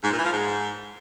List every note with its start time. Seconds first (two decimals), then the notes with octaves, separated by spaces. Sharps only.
0.03 G#2
0.10 A#2
0.17 E3
0.24 F3
0.31 G#2